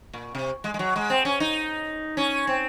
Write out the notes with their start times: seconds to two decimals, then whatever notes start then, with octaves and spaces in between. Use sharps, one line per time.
0.13 A#2
0.35 C3
0.64 G#3
0.74 G#3
0.79 F#3
0.96 G#3
1.10 C4
1.25 C#4
1.40 D#4
2.17 C#4
2.47 C4